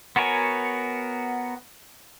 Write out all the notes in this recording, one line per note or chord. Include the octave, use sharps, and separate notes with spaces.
B3 F#4 A#4 C#5 G#5